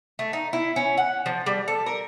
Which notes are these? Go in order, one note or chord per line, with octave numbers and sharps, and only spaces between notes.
A3
D#4
E4
C#4
F#5
F3
G3
A4
A#4